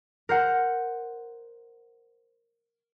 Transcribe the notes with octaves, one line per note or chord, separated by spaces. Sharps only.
A#4 C5 F#5